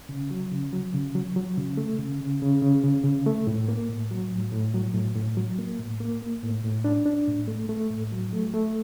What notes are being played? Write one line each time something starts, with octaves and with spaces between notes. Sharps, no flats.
C#3
F#3
C#3
F#3
C#3
F#3
F#3
C#3
A3
C#3
C#3
C#3
C#3
C#3
C#3
A3
A2
A#3
A2
F#3
A2
A2
F#3
A2
A2
F#3
A#3
A2
A#3
A#3
A2
A2
D4
D4
A2
A3
A3
A2
F#3
A3
A3